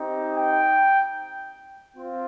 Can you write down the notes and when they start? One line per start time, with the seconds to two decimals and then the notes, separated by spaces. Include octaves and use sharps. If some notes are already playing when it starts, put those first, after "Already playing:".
Already playing: C4 D#4 G4
0.36 G5
1.96 C4 F4